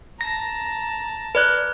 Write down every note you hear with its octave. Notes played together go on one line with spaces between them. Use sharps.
A5 A#5 A#6
B4 D5 F#6